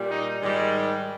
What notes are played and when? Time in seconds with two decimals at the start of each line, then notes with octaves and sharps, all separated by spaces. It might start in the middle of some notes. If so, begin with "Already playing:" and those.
Already playing: A#2 G3
0.10 D#4
0.41 G#2 D#3 G3